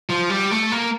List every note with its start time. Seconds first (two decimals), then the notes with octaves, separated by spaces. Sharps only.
0.10 F3
0.30 G3
0.51 A3
0.72 A#3